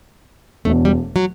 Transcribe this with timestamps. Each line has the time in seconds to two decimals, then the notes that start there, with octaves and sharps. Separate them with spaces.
0.65 E1 E2 B2 A3
0.85 G3
1.16 F#3